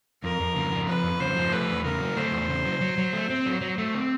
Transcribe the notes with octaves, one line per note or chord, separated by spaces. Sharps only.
F2 A#4
F2
C#3
F3
F2 B4
F2
C#3 C5
F3
A3 B4
E2
C#3 A#4
F#3
A3 C5
E2
C#3
F#3
F#3
F#3
A3
C4
F#3
F#3
A3
C4